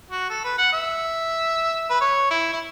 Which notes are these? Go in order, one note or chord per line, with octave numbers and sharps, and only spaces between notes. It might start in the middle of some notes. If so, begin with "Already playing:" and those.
F#4
A4
B4
F#5
E5
B4
C#5
E4
E4